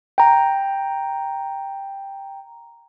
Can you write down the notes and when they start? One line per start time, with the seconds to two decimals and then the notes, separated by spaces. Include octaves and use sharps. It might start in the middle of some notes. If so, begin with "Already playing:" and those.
0.18 G5 A#5